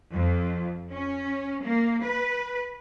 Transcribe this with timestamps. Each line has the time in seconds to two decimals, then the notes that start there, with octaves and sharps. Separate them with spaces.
0.14 F2
0.93 C#4
1.65 A#3
2.05 B4